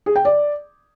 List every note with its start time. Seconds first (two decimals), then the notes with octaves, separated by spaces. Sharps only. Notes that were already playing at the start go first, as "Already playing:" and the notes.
0.06 G#4
0.16 G5
0.25 D5